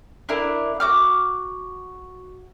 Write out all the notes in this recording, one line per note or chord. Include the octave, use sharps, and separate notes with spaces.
D4 E4 A#4
F#4 D6 F6